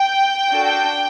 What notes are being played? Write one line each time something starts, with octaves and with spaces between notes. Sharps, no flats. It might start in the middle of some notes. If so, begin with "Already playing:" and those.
Already playing: G5
D4 F#4 A4